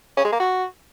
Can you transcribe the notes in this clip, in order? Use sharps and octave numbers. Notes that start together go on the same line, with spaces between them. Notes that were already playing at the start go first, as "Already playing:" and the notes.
C#4
G#3
A#3
F#4